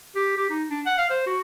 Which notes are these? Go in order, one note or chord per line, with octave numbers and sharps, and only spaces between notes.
G4
G4
D#4
D4
F#5
F5
C5
F#4